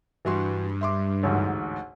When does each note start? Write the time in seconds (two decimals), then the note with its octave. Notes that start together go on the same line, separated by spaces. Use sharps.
0.25 G2 E3 F#4 C6
0.81 E5 C6 D6
1.23 A1 D2 G#2